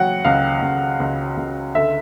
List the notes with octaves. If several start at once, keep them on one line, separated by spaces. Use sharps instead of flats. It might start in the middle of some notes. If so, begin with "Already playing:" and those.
Already playing: C#3 F#3 F#5 G5
C#2 F5
C#2
C#2
C#2
D3 E5